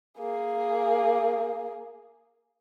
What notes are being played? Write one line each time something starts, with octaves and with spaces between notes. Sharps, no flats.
A#3 G#4